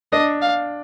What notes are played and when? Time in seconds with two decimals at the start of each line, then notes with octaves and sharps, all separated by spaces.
0.12 D4 D#5
0.42 F5